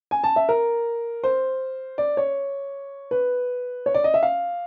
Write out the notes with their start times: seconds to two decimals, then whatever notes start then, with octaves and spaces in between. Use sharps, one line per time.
0.11 G#5
0.24 A5
0.36 E5
0.49 A#4
1.24 C5
1.98 D5
2.17 C#5
3.11 B4
3.86 C#5
3.94 D5
4.04 D#5
4.14 E5
4.23 F5